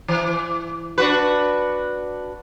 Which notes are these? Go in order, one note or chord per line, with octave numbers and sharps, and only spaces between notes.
E3
D4 F#4 B4